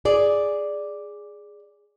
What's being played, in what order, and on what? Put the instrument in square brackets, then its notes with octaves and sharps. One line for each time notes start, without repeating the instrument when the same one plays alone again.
[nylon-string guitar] G#4 D5